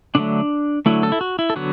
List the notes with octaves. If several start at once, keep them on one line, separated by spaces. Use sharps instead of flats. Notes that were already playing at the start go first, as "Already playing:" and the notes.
D3 F#3 A3 D4
D3 F#3 A3 E4
A4
E4
F#4
E4
A4
D3 F#3 B3 F#4